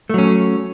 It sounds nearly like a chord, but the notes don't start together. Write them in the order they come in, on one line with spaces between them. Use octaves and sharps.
A3 F#3 C#4